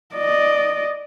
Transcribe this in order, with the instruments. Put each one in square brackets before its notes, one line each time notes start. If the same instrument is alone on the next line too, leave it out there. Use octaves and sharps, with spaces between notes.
[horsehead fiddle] D5 D#5